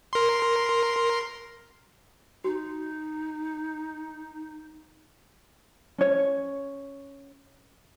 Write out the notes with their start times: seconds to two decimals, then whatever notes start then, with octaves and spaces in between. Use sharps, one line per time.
0.13 A#4 C6
2.44 D#4 F#4
5.98 C#4 C#5